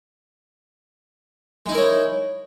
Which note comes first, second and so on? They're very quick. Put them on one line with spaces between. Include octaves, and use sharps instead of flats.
G#3 D#4 E4 A#4 C#5